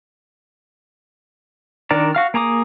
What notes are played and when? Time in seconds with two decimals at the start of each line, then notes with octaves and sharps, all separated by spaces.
1.91 D#3 D4 A#4 D5
2.15 F#4 F5 F6
2.34 A#3 G#4 A#5 D6 D#6